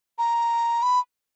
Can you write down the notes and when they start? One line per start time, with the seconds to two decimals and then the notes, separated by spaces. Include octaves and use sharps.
0.18 A#5
0.83 B5